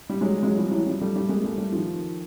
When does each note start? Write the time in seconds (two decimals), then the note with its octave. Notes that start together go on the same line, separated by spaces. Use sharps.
0.10 G3
0.21 F#3 G#3
0.43 F#3 G#3
0.57 F3 G3
0.71 E3 F#3
0.87 F3 G3
1.01 G3 A3
1.15 G3 A3
1.29 G#3 A#3
1.43 G3 A3
1.58 G3 A3
1.72 D#3 F3